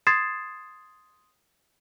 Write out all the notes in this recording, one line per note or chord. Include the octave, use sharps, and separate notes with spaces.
C6 D#6 G#6 A6 C7 E7